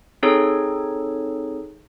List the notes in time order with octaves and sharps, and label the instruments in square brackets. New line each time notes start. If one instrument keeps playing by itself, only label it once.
[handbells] C4 D#4 G#4 A4 C#5